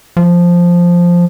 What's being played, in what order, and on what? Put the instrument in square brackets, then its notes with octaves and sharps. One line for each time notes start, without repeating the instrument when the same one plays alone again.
[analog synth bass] F3